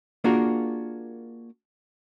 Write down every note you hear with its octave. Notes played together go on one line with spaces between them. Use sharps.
A#3 D4 F4 F#4 G#4 A#4